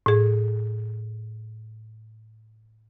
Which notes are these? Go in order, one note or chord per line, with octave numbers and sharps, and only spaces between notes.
A2 G#4